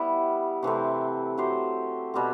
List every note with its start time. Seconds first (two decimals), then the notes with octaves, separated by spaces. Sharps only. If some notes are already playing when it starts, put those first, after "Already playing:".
Already playing: G3 B3 E4
0.63 C3 E3 A3 C4
1.38 F#3 C4 G4 C5
2.14 B2 G3 C4